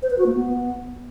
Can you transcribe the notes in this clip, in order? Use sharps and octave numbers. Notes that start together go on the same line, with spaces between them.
C5
B4
F#4
A#3
B3